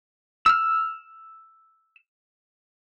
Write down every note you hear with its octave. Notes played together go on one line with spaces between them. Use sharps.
E6 F6